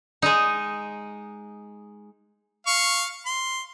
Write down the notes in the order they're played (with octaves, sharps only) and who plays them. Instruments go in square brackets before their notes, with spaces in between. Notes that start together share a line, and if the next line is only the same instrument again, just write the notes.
[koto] G#3 D#4
[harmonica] F5 C#6
C6